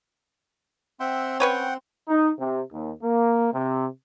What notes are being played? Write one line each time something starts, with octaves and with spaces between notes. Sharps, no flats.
C4 E5 F#5 G5 C6
C#4 B4 C#5 F#5 G5
D#4
C3
D#2
A#3
C3